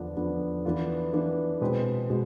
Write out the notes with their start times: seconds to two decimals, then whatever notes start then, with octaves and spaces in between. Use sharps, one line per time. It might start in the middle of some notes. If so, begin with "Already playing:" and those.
Already playing: E2 D3 F3 B3 D4
0.16 E2 D3 F3 B3 D4
0.65 E3 B3 D4 F4
1.13 E3 B3 D4 F4
1.61 B2 G#3 C4 G#4 B4
2.09 B2 G#3 G#4